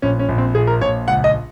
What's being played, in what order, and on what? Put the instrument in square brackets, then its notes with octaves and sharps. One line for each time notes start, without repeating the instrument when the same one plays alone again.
[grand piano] A#1 C#4
C#4
A#1
C4
A#2 G#4
A#4
A#1 C#5
C#2 F#5
D#5